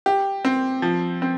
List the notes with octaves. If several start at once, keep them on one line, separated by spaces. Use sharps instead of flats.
G4
C4
F3
C4